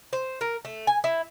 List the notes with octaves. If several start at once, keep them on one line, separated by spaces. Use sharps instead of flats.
C5
A#4
A3
G#5
E4